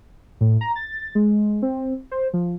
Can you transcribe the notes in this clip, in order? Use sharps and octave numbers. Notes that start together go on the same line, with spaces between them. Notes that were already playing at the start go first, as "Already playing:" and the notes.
A2
A#5
A6
G#3
C4
C5
F3